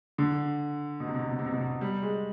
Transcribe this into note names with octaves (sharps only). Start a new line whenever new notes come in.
D3
B2
C3
B2
C3
B2
C3
B2
C3
B2
G3
G#3